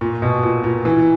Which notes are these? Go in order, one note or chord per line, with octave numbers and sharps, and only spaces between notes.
A#2
B2
A#2
A#2
E3